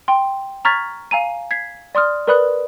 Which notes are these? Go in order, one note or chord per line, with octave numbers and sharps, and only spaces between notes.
G5 C6
A#5 C#6 F6 G#6 A6 B6
F5 G#5 A#5 D#7
G#6 B6 C7
D5 C6 D#6 F6
A#4 B4 D5 B5 D#6 F#6